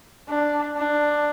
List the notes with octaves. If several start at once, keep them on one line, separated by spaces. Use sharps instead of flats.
D4
D4